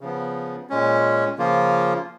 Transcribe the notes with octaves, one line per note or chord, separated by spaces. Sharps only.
C#3 F3 B3
A#2 G#3 C#4
C#3 F3 A#3 F4